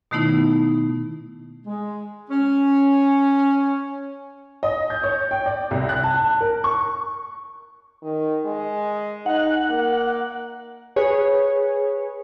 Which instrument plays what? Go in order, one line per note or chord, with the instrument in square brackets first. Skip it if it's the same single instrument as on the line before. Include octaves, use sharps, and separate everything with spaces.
[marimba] B2 D#3 A3 B3 D#4 E4
[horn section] G#3
C#4
[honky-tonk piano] D#5
G6
C#5
G5
D5
C2
F#6
A5
A#4
C#6
[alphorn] D#3
G#3
[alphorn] D#4 [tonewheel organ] F#5
[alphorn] A#3
[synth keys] G#4 B4 C#5